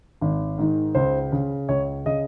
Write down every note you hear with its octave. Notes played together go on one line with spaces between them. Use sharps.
G#1
G#2 D#3
C#2 C5
C#3
C#2 C#5
C#3 D#5